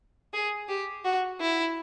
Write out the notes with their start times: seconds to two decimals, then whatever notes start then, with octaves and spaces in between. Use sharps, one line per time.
0.33 G#4
0.69 G4
1.05 F#4
1.40 E4